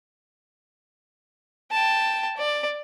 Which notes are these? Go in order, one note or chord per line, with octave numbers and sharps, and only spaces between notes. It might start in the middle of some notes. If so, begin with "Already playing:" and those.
G5 A5
D5